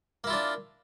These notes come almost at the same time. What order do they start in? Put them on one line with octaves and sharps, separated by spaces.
A#3 E4 F4 D4